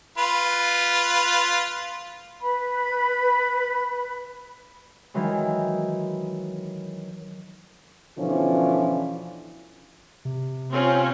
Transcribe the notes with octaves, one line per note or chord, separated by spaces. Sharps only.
F4 B4
B4 B5
D#3 E3 F#3 G#3
B2 D3 E3 F3 C#4 F4
C3
C4 C#4 F4